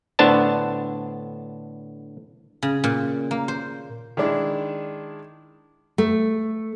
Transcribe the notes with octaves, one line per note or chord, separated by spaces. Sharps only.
A2 D3 B3 D4 C5 A5
C#3
A#2
A#3
C5
D#3 G#3 D4 E4
A3